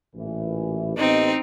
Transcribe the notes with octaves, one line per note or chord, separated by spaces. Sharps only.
A1 A#2 E3
A1 B3 C4 D#4 D#5